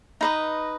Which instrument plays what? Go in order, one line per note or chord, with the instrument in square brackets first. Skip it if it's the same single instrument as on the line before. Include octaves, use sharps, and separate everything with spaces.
[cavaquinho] D#4 B4 D#5